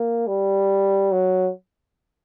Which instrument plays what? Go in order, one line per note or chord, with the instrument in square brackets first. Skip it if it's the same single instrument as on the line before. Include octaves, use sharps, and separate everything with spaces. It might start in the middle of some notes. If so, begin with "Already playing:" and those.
Already playing: [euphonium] A#3
G3
F#3